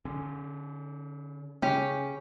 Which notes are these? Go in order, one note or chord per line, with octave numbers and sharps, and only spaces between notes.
D3 C#4
C#3 C#4 G4